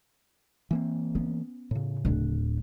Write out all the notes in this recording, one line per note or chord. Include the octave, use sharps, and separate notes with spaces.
E3 A#3 C4
B3 C#4
A2 C#3
D1 D4